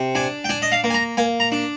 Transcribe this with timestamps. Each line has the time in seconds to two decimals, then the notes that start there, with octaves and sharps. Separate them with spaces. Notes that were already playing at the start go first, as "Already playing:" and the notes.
Already playing: C3
0.15 D4 G#5
0.44 G5
0.49 D4 G#5
0.62 D#5
0.72 F5
0.84 A#3
0.90 G#5
0.94 A#5
1.17 A#3 G#5
1.40 A#5
1.52 D4